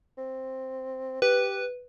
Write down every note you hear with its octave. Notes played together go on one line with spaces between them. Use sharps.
C4
G4 B4